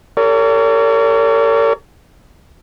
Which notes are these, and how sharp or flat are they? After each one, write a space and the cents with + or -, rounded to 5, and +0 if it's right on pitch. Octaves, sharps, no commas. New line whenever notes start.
G4 +40 A#4 -40 C#5 +45